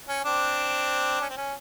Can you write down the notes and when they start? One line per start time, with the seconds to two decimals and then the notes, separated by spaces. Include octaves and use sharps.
0.08 C#4
0.25 C4 D4
1.21 C#4
1.30 C4
1.37 C#4